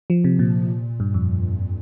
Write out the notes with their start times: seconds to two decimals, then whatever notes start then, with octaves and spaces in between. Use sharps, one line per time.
0.10 F3
0.24 C3
0.39 A#2
1.00 G2
1.14 F2